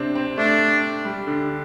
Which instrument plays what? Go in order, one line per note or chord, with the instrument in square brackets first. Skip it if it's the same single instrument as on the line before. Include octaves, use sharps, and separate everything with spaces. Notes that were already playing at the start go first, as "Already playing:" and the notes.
Already playing: [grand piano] C3 C4 D4
C4
[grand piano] A3 [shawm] D4
[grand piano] G3
D3